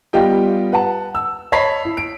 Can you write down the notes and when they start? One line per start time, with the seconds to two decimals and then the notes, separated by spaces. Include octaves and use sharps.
0.13 G3 B3 F4 G4 D#5 G5
0.72 B4 F#5 A5
1.15 E6
1.52 C#5 D#5 A5 B5 B6 C7
1.85 E4
1.97 D7